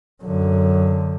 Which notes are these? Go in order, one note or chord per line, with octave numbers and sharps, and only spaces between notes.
F#2 D3